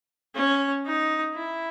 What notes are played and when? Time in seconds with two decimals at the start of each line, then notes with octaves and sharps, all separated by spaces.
0.35 C#4
0.86 D#4
1.35 E4